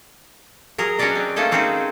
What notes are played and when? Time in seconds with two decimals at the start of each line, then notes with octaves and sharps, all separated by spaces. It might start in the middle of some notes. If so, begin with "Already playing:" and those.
0.78 F#3 G#4 A#4
0.99 C#4 D4 F#4 B4 D5 D#5
1.15 C4
1.36 A3 A#3 C#4 A4 D#5
1.51 A#3 C4 C#4 D#4 F#4 G#4